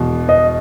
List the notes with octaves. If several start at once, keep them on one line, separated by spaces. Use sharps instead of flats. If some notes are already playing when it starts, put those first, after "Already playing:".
Already playing: E1 E2 B2
D#5